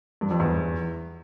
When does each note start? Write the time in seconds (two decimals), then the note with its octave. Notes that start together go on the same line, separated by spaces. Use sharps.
0.21 G2
0.31 F2
0.40 E2